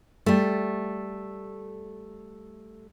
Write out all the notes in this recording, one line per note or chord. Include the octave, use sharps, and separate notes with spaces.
G3 A3